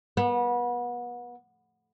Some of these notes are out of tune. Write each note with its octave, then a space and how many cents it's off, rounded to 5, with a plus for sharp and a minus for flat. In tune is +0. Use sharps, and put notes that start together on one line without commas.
B3 -30